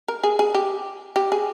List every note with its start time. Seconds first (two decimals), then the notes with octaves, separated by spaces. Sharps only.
0.08 A#4
0.23 G#4
0.39 G#4
0.54 G4
1.16 G4
1.32 G#4